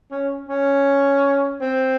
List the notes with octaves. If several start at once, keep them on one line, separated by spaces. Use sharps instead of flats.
C#4
C#4
C4